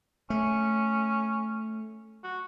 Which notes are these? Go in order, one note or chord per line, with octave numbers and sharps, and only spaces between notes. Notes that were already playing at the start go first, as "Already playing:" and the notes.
A3 C#4
F#4